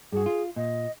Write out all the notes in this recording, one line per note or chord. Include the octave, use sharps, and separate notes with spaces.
G2 F#4 G#4
F4
A#2 D#5